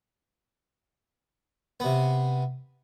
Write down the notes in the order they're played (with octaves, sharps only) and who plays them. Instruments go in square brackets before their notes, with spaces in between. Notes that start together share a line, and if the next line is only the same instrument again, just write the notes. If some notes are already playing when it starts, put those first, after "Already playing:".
[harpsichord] C3 B3